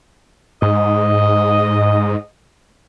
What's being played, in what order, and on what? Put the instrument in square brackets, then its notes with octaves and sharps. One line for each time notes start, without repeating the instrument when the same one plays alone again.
[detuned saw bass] G#2 [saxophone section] D#5